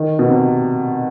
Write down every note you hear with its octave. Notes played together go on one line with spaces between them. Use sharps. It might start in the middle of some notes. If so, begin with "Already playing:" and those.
Already playing: D#3
B2
C3